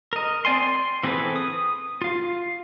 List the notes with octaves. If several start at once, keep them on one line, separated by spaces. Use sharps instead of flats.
A#4 D#5
C4 D5 G#5 C6
C6
E3 C4 G#4 A4 B4
D#6
F4 F5